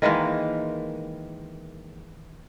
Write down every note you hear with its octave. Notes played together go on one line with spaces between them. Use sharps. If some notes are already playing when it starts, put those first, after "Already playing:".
D#3 E3 G#3 A#3